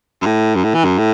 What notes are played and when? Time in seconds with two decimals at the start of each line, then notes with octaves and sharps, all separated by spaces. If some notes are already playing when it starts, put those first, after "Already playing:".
0.22 F#2
0.26 A2
0.55 F#2
0.64 A2
0.74 E3
0.85 F#2
0.98 A2